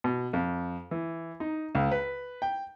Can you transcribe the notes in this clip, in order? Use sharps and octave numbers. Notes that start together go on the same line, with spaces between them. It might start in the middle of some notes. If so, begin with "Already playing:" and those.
B2
F2
E3
D#4
C#2
B4
G5